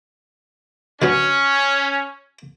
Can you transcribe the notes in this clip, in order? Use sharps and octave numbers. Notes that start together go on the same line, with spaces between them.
D3 F#3 B3 C#4